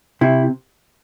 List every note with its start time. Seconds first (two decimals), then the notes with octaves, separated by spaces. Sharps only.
0.21 C3 E4